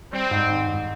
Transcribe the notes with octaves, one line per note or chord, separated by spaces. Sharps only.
G3 C4
G#2
D#3
G#2